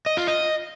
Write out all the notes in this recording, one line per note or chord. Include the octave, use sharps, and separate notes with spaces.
D#5
F4
D#5